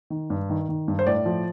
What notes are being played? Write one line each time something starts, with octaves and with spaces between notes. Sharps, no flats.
D#3
G2
D#3
D#3
G2
C5
A2 D5
F3